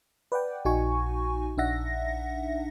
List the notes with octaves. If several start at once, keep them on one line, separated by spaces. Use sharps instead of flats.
B4 D5 F#5 G5
A#1 D#4 F#4 G#5 C#6
A#1 D4 D#4 E5 F#5 A#6